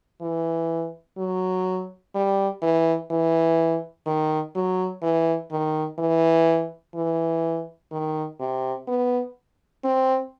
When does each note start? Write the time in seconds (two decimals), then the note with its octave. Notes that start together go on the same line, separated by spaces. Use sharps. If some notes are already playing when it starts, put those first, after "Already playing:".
0.21 E3
1.18 F#3
2.15 G3
2.62 E3
3.11 E3
4.06 D#3
4.55 F#3
5.03 E3
5.52 D#3
5.99 E3
6.95 E3
7.92 D#3
8.40 C3
8.88 B3
9.84 C4